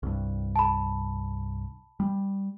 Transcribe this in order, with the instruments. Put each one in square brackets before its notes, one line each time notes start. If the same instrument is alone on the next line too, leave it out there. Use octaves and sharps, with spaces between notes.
[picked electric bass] C2 G2
[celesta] A5 B5
[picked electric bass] G3